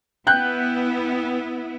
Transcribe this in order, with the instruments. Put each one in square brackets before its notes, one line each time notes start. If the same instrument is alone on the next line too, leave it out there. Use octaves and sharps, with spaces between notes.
[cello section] B3 E4 [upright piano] G5 F#6 G6